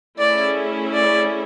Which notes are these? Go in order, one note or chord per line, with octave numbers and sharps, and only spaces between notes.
A3 C#4 E4 G#4 D5
D5